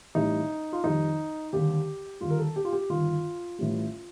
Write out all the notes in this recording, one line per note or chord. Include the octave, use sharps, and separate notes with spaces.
A1 A2 G3 D#4
F4
F2 D#3 G3 D#4
D#2 D3 G3 G4
D#2 D3 G3 F4
A#4
A4
G4
F4
G4
G1 G2 D#3 F4
A1 A2 G3